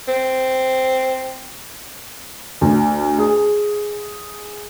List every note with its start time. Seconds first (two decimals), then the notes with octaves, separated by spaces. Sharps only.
0.08 C4
2.61 D2
3.19 G#4